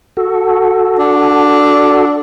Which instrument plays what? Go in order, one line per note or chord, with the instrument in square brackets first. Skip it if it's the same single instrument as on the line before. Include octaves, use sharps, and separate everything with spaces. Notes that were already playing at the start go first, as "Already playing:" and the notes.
[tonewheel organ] F#4 A4
[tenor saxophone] D4